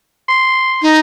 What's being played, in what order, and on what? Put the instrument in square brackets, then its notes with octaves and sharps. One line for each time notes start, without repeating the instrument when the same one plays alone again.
[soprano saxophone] C6
[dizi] D#4